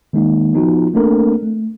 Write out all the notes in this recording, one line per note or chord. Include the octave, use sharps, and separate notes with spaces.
D#3 G#3 A#3 D#4
F3 B3 D#4 F4 F#4
A3 A#3 C4 D4 A4 A#4
A3